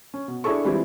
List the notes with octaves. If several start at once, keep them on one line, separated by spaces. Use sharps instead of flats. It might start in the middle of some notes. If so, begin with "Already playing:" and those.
C#4
B2
D4 E4 G#4 A4 C#6
E3 G3 G#3 C4 E4 F4